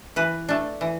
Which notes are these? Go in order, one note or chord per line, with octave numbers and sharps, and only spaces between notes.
E3 B4
A3 D4
E3